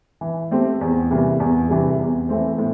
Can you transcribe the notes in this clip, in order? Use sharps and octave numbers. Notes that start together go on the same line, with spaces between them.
E3
A3 C4 G4
E2
C3 E3 G3 A#3
E2
C3 E3 G3
E2
E3 A3 C4
A2